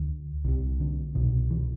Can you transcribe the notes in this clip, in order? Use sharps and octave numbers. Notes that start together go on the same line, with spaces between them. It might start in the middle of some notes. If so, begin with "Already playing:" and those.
Already playing: D2 D3
C2 C3
D3
C2 B2
E3